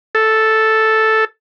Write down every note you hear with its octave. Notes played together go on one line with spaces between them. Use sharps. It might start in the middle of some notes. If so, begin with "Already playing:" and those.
A4